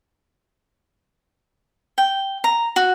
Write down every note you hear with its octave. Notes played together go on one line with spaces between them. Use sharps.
G5
A#5
F#4